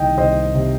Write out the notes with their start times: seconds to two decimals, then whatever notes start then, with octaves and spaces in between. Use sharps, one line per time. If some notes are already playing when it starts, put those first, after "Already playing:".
Already playing: C2 D#3 D#5 G5
0.18 C2 C5 D#5
0.54 C3